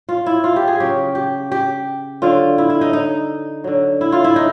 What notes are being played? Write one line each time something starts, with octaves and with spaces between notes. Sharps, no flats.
F4
E4
F4
G4
G#4
C#3 F#3 G4
G4
G4
D3 F#3 F4
E4
E4
D#4
D#4
D3 F#3
E4
F4
E4
D#4